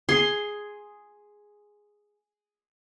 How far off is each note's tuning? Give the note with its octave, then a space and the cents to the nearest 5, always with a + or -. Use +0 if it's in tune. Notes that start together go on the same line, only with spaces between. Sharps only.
G#4 +0 C6 +10